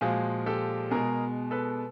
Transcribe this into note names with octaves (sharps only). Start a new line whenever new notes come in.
A#2 F3 G#3 F#4 G#4
G4 A4
B2 G#3 G#4 A#4
A4 B4